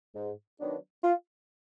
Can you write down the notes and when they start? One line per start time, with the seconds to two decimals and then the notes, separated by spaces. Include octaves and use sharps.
0.15 G#2
0.59 D#3 F#3 B3 D4
1.03 F4